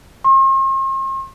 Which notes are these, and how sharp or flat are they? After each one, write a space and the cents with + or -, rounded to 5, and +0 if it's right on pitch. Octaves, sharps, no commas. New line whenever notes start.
C6 +45